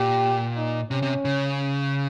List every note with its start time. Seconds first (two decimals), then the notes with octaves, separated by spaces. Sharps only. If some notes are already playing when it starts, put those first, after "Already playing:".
Already playing: A#2 G4
0.57 D#4
0.90 C3 C#4
1.03 C3
1.25 C#3